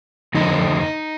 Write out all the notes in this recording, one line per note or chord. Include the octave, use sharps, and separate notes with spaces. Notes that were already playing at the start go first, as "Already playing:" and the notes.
F2 D3 F3 D#4